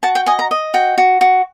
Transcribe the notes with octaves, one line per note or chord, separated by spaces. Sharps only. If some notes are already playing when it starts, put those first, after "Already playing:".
F#4 A5
G5
D#5 G#5
A#5
D#5
F#4 G5
F#4
F#4